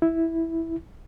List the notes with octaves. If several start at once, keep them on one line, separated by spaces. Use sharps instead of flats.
E4